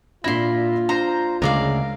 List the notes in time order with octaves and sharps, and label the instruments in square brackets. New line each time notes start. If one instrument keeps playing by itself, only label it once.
[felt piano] A#2 D4 A#6 [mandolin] E4 C6 [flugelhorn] F4
[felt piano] D4 [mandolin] C5 A#5
[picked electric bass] D2 C#3 G#3 [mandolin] A#4 D5 F5